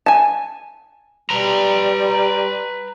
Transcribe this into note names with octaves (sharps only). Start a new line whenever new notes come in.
G#5 A5
G3 B4 A#5